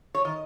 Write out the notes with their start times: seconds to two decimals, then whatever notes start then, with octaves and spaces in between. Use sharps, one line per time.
0.15 C#5
0.25 D#3 D#5